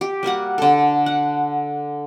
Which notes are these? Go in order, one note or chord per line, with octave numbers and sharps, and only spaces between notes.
G4
G3 A#3 F#4 F#5
D3 A4
F#5